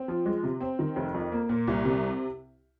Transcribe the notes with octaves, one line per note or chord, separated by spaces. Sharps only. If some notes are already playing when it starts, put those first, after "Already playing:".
Already playing: C4
F3
G#3
C3
C4
D#3
F1
F2
A#3
A#2
C2
C3